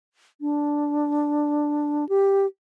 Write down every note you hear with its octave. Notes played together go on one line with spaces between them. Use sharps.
D4
G4